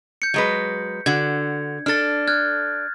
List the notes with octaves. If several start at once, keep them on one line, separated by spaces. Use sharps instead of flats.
G6 C#7
F#3 G#3 B4
D3 F#4 G#6
D4 A4 F6 A6
F6 F#6 G#6